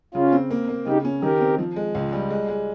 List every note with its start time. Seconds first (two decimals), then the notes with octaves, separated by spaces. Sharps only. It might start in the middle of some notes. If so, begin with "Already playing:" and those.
0.14 C#3 C#4 F4
0.32 C4
0.51 A#3
0.69 A#3
0.87 C#3 D#4 G4
1.05 C#4
1.22 D#3 G4 A#4
1.41 C4
1.58 F3
1.76 G#3
1.95 C#2
2.13 G3
2.30 G#3
2.48 G#3